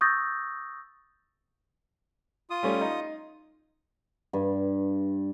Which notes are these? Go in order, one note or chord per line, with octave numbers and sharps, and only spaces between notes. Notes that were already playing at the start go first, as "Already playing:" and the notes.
C#6 D#6 E6 G6 A6 A#6
F4 D#6
G3 A3 C#4
D#4
G2